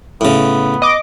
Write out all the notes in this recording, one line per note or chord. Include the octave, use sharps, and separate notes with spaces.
A2 C#3 B3
D#5 D6